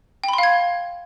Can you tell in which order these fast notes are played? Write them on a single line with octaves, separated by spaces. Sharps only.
G5 B5 C6 F5 G#6